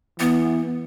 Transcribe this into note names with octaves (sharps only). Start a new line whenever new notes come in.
E3 B3